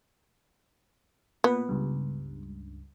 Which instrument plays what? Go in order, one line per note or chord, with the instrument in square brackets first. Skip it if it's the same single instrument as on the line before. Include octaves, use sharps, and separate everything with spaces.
[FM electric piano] A#2 B4 [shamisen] B3
[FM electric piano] C#2 G2